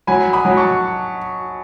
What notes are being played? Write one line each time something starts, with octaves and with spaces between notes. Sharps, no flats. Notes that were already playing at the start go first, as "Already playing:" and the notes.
F#3 G#5 B5
B5 D#6
F#3
A5 C#6